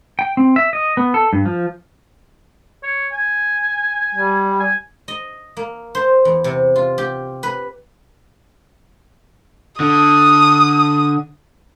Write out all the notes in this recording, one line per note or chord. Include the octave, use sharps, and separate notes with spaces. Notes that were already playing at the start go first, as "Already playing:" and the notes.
G5
C4
E5
D#5
B3
A4
G2
F3
C#5
G#5
G3
G#5
D#5
A#3
C5
E2
C3
F4
G4
B4
D3 D#6